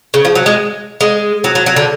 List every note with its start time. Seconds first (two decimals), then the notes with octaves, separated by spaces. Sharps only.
0.14 C#3
0.25 F3
0.35 F#3
0.46 G#3
1.01 G#3
1.44 F#3
1.55 F#3
1.66 F#3
1.76 D3